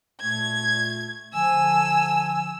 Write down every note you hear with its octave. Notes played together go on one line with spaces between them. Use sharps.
A#2 A3 G#6
D3 F3 G#5 E6